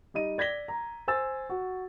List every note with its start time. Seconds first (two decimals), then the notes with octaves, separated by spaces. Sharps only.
0.14 G3 D#4 D#5 D#7
0.38 D5 G#6 A#6 B6 G7
0.68 A#5
1.08 C5 G#5 E6 A6
1.49 F#4